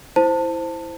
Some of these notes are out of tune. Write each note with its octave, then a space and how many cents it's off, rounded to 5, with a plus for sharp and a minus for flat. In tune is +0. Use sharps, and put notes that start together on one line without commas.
E4 +0 C5 -5 A5 +20